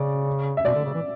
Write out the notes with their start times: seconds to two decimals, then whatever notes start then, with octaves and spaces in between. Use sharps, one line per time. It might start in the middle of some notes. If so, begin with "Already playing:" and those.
Already playing: C#3 D5
0.57 E5
0.65 B2 D5
0.74 D3
0.85 C#3
0.94 E3